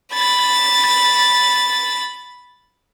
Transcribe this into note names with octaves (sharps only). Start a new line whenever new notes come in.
B5 A6